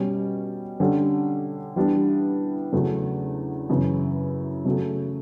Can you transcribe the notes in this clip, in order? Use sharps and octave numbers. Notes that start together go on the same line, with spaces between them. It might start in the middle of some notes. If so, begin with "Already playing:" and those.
Already playing: B2 G3 C#4
D3 G3 C#4
E3 G3 B3 D4
E2 C#3 F#3 A3
F#2 C#3 E3
C#3 F#3 A3